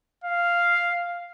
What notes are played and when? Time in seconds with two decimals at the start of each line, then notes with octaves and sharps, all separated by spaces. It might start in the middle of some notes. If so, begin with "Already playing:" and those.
0.24 F5